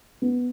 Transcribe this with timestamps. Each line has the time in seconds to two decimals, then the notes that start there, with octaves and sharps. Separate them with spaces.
0.22 B3